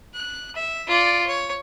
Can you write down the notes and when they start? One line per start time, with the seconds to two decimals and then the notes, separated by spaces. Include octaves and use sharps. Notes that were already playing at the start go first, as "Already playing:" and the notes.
0.15 F#6
0.56 E5
0.87 F4 D5
1.27 C#5